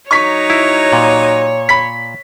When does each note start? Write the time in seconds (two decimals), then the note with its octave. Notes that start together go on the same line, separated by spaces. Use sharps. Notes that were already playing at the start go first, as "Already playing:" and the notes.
0.11 F#3 D#4 C#5 C#6 B6
0.50 E4
0.93 A#2
1.69 B5 B6